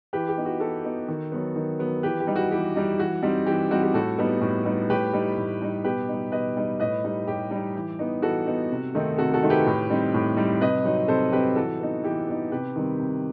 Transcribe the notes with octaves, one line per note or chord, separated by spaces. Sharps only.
E3 G4 B4
G4
B3 D#4
F#4
E3 F#4 A4
B3 D#4
D#3
F#3 B3
D#3
F#3 B3
E3 G4 B4
G4
G3 D#4
F#4
E3 G4
G3 D#4
E3 F#4
G3 C4 D#4
E3 G4
G3 C4 D#4 F#4
G4
A2 F#4 A4
G3 B3 D#4
A2
G3 B3 D#4
A2 G4 B4
G3 D#4
A2
G3 D#4
B2 G4 B4
G3 D#4
B2 B4 D#5
G3 D#4
A2 B4 D#5
G3 D#4
A2 G4
G3 D#4
E3
B3 D#4
E3 F#4 A4
B3 D#4
C3
D#3 A3 C4 D#4
C3 F#4 A4
F#4 A4
D#3 A3 C4 D#4
G4 B4
A2
G3 C4 D#4
A2
G3 C4 D#4
C3 B4 D#5
F#3 C4 D#4
C3 A4 C5
F#3 C4 D#4 G4 B4
E3 F#4 A4
B3 D#4
E3 G4
B3 D#4
C3 G4 B4
D#3 G3 C4
C3